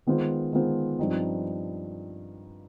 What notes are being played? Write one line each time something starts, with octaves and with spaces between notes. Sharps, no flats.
D#3 G#3 B3 F4 C5
D#3 G#3 B3 F4 C5
G2 F3 C4 D#4